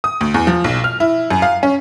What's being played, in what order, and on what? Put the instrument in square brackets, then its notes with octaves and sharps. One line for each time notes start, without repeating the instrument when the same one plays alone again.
[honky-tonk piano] D#6
D2
E2
F3
B1
F6
E4
F#2
F5
C#4